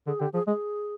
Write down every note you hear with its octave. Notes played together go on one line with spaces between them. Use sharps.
D3 G#4
D3 G4
F3 G#4
G#3 G#4